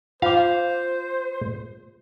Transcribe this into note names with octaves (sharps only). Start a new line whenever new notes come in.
F4 C5 F5 D6